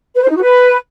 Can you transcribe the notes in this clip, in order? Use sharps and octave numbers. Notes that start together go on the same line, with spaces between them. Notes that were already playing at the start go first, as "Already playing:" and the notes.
B4
C5
D#4
F#4
B4